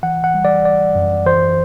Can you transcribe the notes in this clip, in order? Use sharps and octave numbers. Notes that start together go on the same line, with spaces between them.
E3 F#5
F#5
G3
D5
G1 D5
F#2
E3 C5